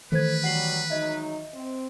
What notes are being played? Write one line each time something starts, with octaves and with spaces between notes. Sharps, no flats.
D#3 E3 A3 A4 B4 C5 G#6
F#3 G3 F#5 C7 F#7
F#3 G#3 D#4 D#5 E5
C4